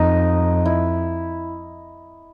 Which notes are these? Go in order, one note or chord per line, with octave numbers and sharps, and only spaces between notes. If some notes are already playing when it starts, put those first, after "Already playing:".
Already playing: F2 D#4
E4